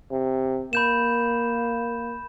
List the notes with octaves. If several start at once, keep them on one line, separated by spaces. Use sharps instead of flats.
C3
A#3 B5 G6 E7